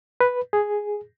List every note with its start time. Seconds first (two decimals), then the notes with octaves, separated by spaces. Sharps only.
0.21 B4
0.53 G#4